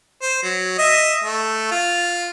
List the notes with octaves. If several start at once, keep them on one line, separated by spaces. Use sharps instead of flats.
C5
F#3
D#5 E5
A3
F4